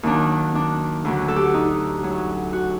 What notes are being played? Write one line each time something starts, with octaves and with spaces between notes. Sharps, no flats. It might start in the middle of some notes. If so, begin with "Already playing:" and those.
D#2 D#3 F#3 D4
D4
D2 D3 F#3
A4
G4
F#4
D#4
F#2 F#3
F#4